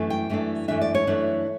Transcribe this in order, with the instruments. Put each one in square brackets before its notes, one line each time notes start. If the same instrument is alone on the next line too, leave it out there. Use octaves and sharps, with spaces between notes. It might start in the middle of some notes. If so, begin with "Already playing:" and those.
Already playing: [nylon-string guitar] F#2 E3 A3 D4
G5
F#2 E3 A3 D4
F#2 E3 A3 D4 E5
D5
C#5
F#2 E3 A3 D4